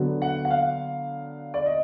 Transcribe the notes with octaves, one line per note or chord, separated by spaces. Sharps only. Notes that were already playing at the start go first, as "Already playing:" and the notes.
Already playing: D3 F#3 B3
F#5
F#5
F5
D5
D#5